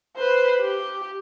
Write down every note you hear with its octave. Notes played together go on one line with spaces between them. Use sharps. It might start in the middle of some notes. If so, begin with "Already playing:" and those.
B4 C5
G4